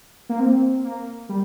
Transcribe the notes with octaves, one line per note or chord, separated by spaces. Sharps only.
A#3
C4
A#3
G3